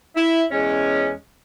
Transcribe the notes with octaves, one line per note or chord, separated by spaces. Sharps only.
E4
E2 G#3 C#4